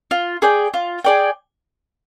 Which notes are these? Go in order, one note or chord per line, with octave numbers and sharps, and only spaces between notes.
F4
G#4 D5 G5
F4
G#4 D5 G5